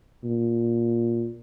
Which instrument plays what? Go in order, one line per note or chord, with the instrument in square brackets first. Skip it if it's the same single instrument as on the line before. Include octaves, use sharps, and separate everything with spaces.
[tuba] A#2